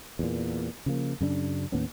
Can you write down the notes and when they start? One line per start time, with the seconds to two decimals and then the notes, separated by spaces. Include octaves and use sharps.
0.19 E2 A#2
0.86 C#3 F3 A#3
1.21 F#2 C#3 D4
1.72 D#2 A2 B3 C#4